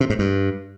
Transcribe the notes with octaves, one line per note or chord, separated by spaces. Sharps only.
C3
G#2
G2